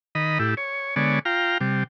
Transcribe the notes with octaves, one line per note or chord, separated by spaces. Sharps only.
D#3 D#5 B5
A2 E4 G4
C#5
D3 G#3 B3 C#5 D5
F4 F5 G5 A#5
C3 G3